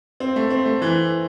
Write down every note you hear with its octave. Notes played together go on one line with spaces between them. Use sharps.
C4
A3
C4
A3
E3